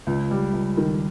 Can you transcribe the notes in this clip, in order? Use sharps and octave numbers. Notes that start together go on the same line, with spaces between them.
C#2
G3
C#2
D#3